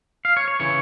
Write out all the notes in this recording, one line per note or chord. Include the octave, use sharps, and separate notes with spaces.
F5
C#5
C#5
C#3 E3 C#5